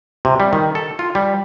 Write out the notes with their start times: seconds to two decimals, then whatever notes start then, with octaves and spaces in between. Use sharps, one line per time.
0.25 C3
0.40 G3
0.53 D#3
0.75 A4
0.99 F4
1.15 G3